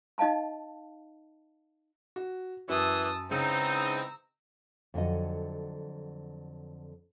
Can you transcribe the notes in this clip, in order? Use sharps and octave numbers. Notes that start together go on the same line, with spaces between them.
D#4 D#5 F5 A5 B5
F#4
F#2 E3 A5 D#6 E6
G#2 C#3 E3 C4 D#4 A#5 E6
F2 D3 F#3 D#5